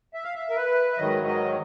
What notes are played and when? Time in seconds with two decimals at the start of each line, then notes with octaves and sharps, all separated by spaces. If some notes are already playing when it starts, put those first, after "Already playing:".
0.14 E5
0.24 F5
0.35 E5
0.50 A#4
0.56 B4
0.92 E5
0.98 G#2 D#3 F#3 D#5
1.27 D#5